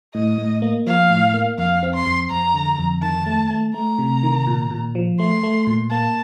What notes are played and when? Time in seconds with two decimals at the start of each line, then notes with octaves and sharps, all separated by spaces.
0.15 A2 D#5
0.38 A2
0.62 A#3
0.86 F3 F5
1.11 A2
1.34 A#3
1.58 F2 F5
1.83 C4
1.94 C6
2.06 F2
2.30 F2 A#5
2.54 D3
2.79 F2
3.02 D#3 A5
3.26 A3
3.51 A3
3.74 A3 A#5
3.98 C3
4.23 D#3
4.47 A#2
4.70 A#2
4.95 F3
5.19 A3 C6
5.43 A3
5.67 A#2
5.91 A#3 A5